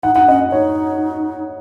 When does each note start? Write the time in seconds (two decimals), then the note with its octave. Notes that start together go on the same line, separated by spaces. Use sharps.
0.03 D#4 F#5
0.15 D#4 F#5
0.28 C#4 D#5
0.52 D#4 C#5